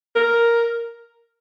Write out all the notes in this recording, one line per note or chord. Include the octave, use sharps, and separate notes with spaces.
A#4